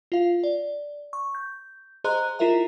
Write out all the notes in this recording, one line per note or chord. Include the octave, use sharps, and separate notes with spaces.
F4 F5
D5
C#6
G6
G#4 C5 D#5 A#5 C6 F#6
E4 F4 G#4 A#4 E5 A#5